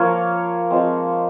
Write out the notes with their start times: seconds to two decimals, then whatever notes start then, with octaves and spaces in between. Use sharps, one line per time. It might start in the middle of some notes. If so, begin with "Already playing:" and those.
Already playing: F3 A#3 F4 C#5 F5
0.70 F3 G#3 C4